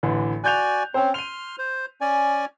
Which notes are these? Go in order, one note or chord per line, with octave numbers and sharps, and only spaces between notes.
A1 D3 E3
F#4 D5 G#5 F#6 G6 F7
C4 C#4 C5
C6 F6 D#7 F7
C5
C#4 D5 G#5